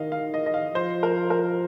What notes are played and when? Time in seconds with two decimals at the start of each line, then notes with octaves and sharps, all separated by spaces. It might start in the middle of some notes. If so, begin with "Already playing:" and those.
Already playing: D#3 D#5 F5
0.12 F5
0.34 D#5
0.46 D#5
0.54 F5
0.75 F3 C5
1.03 A#4
1.30 A#4